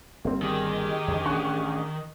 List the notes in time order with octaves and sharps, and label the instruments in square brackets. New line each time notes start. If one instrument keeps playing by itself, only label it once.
[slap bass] G1 G3 [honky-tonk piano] A#3 C4
[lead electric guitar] D#3 [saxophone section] G4 G#4
[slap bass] F2 D3
[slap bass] A1 C#4 D4 [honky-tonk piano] C#6 F#6